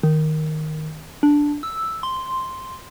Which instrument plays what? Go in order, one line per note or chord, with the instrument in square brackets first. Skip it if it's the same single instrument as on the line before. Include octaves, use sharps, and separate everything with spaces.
[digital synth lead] D#3
D4
E6
C6